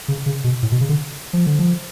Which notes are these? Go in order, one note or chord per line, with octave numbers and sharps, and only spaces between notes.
C#3
C#3
B2
A2
B2
C#3
D3
F3
D3
F3